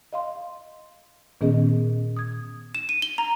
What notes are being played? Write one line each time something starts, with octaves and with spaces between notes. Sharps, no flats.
D#5 F5 C6
A#2 D#3 B3 C#4 G#4 D#5
D#6 G#6
E7
D#7
G7
A#5